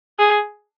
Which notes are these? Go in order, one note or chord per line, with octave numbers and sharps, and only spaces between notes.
G#4